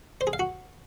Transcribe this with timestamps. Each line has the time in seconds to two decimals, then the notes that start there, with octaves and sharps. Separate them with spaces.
0.21 C5
0.27 G#4
0.33 F5
0.39 F#4